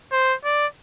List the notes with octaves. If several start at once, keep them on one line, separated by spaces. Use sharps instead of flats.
C5
D5